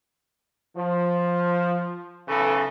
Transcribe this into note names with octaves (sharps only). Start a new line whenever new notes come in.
F3
B1 C#3 E3 A4